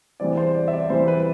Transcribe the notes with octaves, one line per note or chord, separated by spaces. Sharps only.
E2 C3 E3 G3 C4 D5
C5
D5
E5
D5
E2 C3 E3 G3 C4 C5
B4